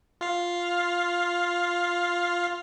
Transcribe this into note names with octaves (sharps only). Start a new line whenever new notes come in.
F4 F5